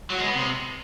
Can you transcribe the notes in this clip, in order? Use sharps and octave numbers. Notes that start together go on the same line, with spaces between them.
F#3
G#3
B3
C3